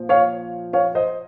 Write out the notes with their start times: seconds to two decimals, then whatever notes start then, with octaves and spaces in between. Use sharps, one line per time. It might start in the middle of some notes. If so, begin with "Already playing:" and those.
Already playing: A#2 F3
0.09 C#5 F5
0.73 C#5 F5
0.95 C5 D#5